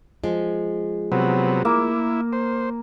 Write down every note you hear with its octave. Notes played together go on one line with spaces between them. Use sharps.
F3 G#3
C3 F#3 B3
A#3 E4
C5